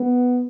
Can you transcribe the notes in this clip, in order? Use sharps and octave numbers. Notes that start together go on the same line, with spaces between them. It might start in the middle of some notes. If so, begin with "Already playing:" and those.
Already playing: B3